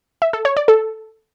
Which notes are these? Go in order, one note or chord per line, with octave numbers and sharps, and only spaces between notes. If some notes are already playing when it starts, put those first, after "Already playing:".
E5
A4
C#5
D5
A4